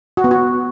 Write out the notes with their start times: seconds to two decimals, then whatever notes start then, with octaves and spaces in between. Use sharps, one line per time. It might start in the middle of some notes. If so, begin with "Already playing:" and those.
0.17 F#4
0.24 B3
0.31 F#4